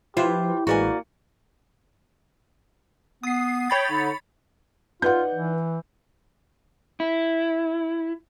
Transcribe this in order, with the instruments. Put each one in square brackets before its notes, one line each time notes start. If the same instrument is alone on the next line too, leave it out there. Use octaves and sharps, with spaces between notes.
[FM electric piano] F3 B4 [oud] E4 C5 [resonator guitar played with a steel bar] F4 [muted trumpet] G4
[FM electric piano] A1 G#3 B4 [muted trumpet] A#3 [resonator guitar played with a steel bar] F#4 D5 G#5
[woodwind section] B3 [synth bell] D#6 C7
[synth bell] C#5 B5 A6 [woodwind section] G5
[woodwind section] D3 D#4
[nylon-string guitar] D#4 B4 D5 [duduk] F4 [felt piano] F#5 G6
[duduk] E3
[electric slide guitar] E4